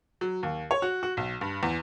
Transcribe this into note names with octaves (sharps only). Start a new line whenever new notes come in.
F#3
D#2
C#5
F#4
F#4
B1
G2
E2